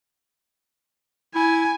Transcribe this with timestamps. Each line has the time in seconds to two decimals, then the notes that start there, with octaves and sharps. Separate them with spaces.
1.35 E4 G#5